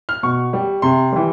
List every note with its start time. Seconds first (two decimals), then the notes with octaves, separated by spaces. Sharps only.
0.09 F6
0.23 B2 C#6
0.53 G3
0.82 C3 C6
1.12 E3 G3